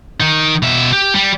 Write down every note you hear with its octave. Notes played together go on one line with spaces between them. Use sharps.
D#3 D#4
B2 E5
G4
G3